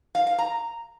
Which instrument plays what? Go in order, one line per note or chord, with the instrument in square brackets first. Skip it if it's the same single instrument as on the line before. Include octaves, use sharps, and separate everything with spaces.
[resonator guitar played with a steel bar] F5
F5
A#5